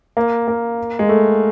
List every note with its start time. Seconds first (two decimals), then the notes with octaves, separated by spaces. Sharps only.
0.17 A#3
0.48 A#3
0.99 G#3
1.09 A3